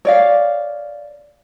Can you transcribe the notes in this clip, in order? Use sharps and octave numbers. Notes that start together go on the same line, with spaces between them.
C#5 D5 F5